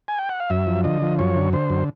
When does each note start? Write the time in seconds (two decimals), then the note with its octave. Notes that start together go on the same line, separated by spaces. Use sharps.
0.08 G#5
0.19 G5
0.29 F#5
0.40 F5
0.50 F#2 E5
0.67 F3
0.84 D3 D#5
1.02 F3
1.19 F#2 C#5
1.36 D3
1.53 D3 C5
1.70 F#2